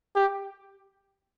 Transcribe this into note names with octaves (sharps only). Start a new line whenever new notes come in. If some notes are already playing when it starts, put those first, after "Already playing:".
G4